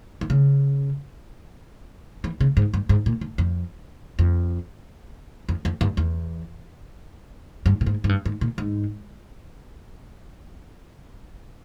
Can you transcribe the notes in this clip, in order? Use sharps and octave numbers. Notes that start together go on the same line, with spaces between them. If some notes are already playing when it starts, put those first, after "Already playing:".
E3
C#3
E3
C#3
G#2
G2
G#2
A#2
G2
F2
F2
F2
F2
G2
E2
G2
A#2
G#2
G#2
G2
G#2
A#2
G#2